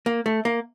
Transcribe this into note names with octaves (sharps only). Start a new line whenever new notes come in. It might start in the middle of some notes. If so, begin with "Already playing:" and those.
A#3
A3
A#3